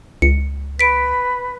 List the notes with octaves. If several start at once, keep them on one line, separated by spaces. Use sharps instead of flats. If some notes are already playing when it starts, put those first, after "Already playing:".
C#2 C#7
B4 B6 D7